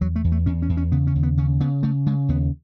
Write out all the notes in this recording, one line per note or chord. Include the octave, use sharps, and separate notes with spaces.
E2 F#3
A3
E2
A3
E2 C#4
C#4
E2
C#4
C#3 B3
C#4
D#2
B3
C#3 C#4
C#3 B3
C#3 A3
C#3 G#3
D#2 B3